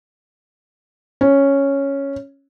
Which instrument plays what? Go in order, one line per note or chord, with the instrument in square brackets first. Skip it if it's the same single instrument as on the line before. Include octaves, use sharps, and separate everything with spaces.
[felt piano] C#4